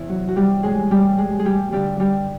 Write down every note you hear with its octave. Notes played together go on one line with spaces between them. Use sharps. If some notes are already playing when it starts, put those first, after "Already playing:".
Already playing: E2 C3 E4
F#3 F#4
F#4
G3 G4
A2 E3 G#3 G#4
G3 G4
G#3 G#4
G#4
G3 G4
G2 D3 G3 G4
G3 G4